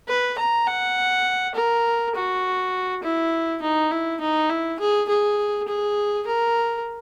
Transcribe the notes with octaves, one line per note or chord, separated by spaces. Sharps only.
B4
A#5
F#5
A#4
F#4
E4
D#4
E4
D#4
E4
G#4
G#4
G#4
A#4